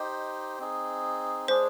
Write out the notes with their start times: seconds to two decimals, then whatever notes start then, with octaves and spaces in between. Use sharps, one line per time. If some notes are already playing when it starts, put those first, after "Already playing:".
Already playing: D#4 G4 C5 D#5
0.59 C4 D#4 G#4
1.48 G#3 D4 G#4 C5